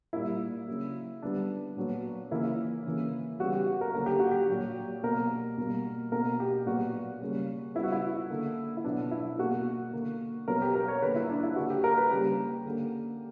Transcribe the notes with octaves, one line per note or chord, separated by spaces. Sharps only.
A#2 G3 A#3 E4
C#3 F#3 A#3
D3 G3 B3 D4
A#2 F#3 B3
C#3 E3 A#3 E4
C#3 E3 A#3
C#3 G3 B3 F#4
G4
F#4
A#4
D3 F#3 A#3 A#4
G4
F#4
G4
A#2 F#3 A#3
B2 A#3 A#4
B2 G3 A#3
B2 A#3 A#4
G4
A#2 F#3 B3 F#4
C#3 G3 A#3
C#3 G3 B3 E4
F#4
E4
D3 A#3
E4
B2 F#3 B3 D4
E4
B2 A#3 F#4
D3 A#3
B2 F#3 B3 A#4
G4
A#4
C#5
D3 A#3 B4
E4
D4
E4
D3 A#3 F#4
G4
A#4
B4
C#3 G3 A#3 G4
D3 A#3